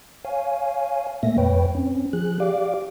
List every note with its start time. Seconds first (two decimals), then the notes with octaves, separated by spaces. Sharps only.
0.25 C#5 F5 G#5
1.23 A#2 A3 A#3 E5 A#6
1.38 F2 B4 C#5 G5
1.75 C4 C#4
2.13 F3 G#4 F#6
2.40 G4 D5 F5 D6